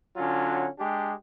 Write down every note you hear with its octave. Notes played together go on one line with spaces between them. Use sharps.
D3 F#3 C#4 F4
G#3 D4 G4